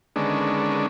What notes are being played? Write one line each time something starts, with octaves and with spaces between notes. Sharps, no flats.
D3 D#3 G#3 B3 C#4 D4